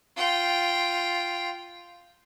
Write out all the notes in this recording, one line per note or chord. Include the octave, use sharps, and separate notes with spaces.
F4 G5